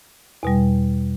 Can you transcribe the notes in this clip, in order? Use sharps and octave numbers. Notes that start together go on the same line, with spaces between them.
E2 B2 G3